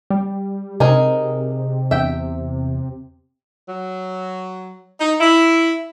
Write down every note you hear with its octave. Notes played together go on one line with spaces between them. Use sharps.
G3
C3 G#3 D#4 G#4 A#4
E2 E5 G5
F#3
D#4
E4